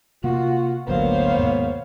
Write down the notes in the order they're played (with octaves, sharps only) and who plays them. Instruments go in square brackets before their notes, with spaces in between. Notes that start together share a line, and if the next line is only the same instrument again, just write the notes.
[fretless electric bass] C3 A#3 [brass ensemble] F4 [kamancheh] F#4
[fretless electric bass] G#1 D2 F#3 [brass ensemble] A#3 B3 C#5 [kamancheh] C5 F5
[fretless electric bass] D#2 G#2 B2